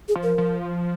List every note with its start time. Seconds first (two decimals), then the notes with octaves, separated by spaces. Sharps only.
0.08 G#4
0.16 F3
0.23 A#4
0.38 F3